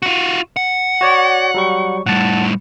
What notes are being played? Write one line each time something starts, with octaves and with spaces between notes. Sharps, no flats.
F4 F#4
F#5
F#4 C#5 D5
F#3 G3 C#6
A2 G3 F#5 A5